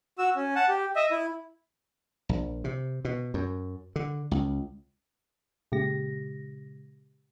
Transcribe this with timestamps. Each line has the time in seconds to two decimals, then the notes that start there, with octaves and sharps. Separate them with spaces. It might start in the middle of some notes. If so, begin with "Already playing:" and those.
0.19 F#4 E6
0.36 C#4
0.56 F#5 A5
0.68 G4
0.96 D#5 E5
1.11 E4
2.29 A#1
2.64 C3
3.05 B2
3.34 F#2
3.96 D3
4.31 C#2
5.72 A#2 C#3 G#3 G4 A#6